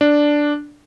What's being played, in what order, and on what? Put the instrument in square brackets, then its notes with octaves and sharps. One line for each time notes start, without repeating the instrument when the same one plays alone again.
[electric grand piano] D4